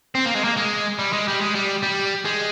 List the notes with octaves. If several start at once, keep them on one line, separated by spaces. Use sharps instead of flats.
C4
A#3
G#3
A#3
G#3
G3
G#3
G3
G#3
G3
G3
G#3